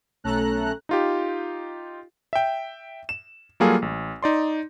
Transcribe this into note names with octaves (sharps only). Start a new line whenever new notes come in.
B1 A3 C#4 A4 A#5 F#6
D#4 F4 G4
E5 G5
E7
F#3 G3 A#3 F4 G#4 A4
A1
D#4 D5 C6